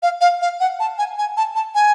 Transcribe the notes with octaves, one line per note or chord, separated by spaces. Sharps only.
F5
F5
F5
F#5
A5
G#5
G#5
A5
A5
G#5